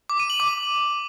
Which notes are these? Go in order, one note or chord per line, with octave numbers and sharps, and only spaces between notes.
D6
D#7
F#7
D6